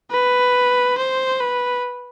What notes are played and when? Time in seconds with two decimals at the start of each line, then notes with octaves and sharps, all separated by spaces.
0.11 B4
0.98 C5
1.40 B4